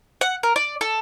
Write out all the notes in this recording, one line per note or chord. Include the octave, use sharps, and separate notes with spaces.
F#5
A#4
D5
A4